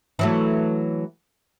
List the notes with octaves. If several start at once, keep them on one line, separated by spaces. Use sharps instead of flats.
E3 F#3 A3